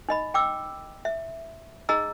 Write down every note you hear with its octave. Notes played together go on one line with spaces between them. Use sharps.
D#4 D#5 B5
G5 D6 E6
E5
D#4 G#4 D#5 A#5 E6